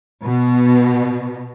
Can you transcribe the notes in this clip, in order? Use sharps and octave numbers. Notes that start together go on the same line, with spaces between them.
B2